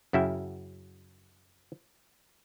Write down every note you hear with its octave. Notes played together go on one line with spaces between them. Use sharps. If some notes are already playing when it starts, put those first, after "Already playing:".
F#2 C#3 E4 F#4 E5 G5